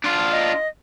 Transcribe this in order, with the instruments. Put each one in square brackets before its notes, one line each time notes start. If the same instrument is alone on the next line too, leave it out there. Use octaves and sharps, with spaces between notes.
[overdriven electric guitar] D4 F4
[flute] D#5